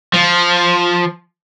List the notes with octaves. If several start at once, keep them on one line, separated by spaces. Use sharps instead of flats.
F3